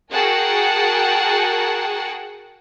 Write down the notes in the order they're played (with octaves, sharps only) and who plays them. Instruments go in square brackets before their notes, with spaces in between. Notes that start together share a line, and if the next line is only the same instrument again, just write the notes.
[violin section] F#4 G#4 A#4 F#5 G5 A5